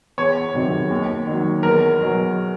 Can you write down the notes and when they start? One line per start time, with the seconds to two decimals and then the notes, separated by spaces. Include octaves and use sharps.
0.18 E2 C#5
0.54 C3 D#3 F#3
0.90 D#2
1.27 D#3 F#3
1.63 E2 A#4
1.99 B2 F#3